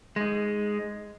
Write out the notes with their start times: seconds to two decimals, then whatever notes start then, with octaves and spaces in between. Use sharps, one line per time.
0.16 G#3 D#4